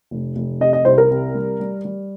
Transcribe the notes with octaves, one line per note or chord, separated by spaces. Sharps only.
F1
F1
C3 D#5
D#5
C2 C5
A#4
C3
G3
G3
G3